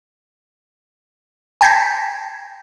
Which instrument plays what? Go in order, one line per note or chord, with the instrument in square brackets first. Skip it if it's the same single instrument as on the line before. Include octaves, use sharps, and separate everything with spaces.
[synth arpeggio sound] G5 A5 G6 G#6 A#6 B6